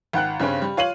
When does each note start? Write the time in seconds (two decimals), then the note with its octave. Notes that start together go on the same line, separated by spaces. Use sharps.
0.13 G#1 F#5 G5 F#6
0.40 G2 C#3 C4 C#4
0.62 G3
0.77 F4 C#5 F5 D#7 F#7